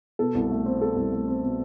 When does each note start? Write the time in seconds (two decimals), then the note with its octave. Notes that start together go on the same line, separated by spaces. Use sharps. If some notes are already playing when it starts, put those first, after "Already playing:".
0.19 B2 A4
0.35 C2
0.50 A3
0.66 C4
0.81 B2 A4
0.96 C2
1.12 A3
1.28 C4
1.42 B2